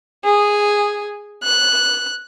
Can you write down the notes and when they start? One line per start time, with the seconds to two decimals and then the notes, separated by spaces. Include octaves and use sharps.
0.24 G#4
1.43 F#6